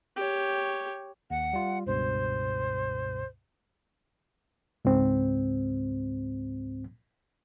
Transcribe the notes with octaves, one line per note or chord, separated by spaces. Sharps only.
G4 C#5
D#2 F#5
G3 F4
C#2 G2 B2 C5
C#2 G#2 C4